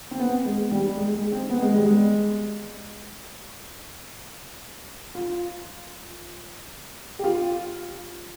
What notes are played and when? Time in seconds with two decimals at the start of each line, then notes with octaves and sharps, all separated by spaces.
0.11 C4
0.20 B3
0.45 G#3
0.71 G3
0.97 G#3
1.15 G#3
1.32 C4
1.50 B3
1.62 G#3
1.74 G3
1.86 G#3
5.15 F4
7.19 G4
7.24 F4